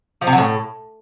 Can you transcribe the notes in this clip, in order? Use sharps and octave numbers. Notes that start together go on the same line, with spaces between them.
F3
C3
F#3
A2